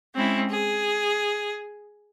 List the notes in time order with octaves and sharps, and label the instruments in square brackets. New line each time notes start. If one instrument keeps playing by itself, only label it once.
[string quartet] G#3 C4 C#4 E4
G#4